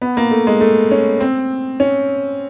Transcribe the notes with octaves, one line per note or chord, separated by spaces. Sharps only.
B3
A#3
A3
G#3
A3
C#4
C4
C#4